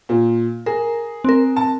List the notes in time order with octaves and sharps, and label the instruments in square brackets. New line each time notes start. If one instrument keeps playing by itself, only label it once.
[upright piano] A#2
[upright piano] G#4 [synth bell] A#4
[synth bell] C4 A#4
[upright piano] A5